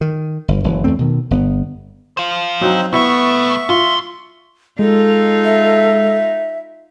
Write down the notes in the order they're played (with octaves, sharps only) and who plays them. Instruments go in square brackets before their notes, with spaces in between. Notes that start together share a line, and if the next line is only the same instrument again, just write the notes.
[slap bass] D#3
G1
F#1 E3 F#3
E2 A3 C4
B2 D#3
G1 B3
[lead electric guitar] C5 F5
[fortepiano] F#3 [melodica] C4 D#4
[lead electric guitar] C2 A3 [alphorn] B3 [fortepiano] E4 [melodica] E5 C#6
[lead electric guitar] A2 C6 [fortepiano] F4
[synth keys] G#3 [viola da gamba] D#4 F4 [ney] A4
[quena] E5